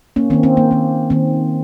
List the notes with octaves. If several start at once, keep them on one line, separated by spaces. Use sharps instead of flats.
A#3 C#4
D#3 A#3 C4
C4
A#3
D#3 A#3
D#3 A#3 C4